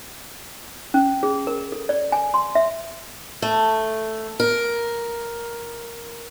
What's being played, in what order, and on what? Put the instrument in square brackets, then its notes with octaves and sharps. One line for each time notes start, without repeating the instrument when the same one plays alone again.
[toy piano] C#4
G#4
A#4
A4
D5
G#5
C6
E5
[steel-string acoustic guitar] A3
A#4